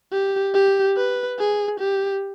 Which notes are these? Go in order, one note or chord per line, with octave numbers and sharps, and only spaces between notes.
G4
G4
B4
G#4
G4